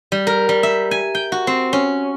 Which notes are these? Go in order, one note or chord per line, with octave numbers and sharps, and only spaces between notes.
G3
A#4
G3
E5
G#5
G5
F#4
C4
C#4